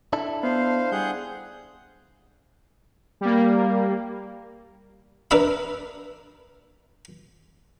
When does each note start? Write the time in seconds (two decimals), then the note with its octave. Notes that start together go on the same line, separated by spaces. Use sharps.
0.13 D4 E4 A4
0.43 B3 C5 F5
0.92 G3 G#4 F#5 G6
3.21 G3 A#3
5.31 D4 A#4 B4 D5 E5 B5